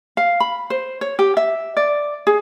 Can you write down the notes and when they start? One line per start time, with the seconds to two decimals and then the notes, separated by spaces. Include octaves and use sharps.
0.17 F5
0.40 B5
0.70 C5
1.01 C#5
1.19 G4
1.37 E5
1.77 D5
2.27 G#4